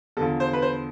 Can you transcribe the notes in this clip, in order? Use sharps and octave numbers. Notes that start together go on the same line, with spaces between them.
E2 D3 F3 A4
C5
B4
C5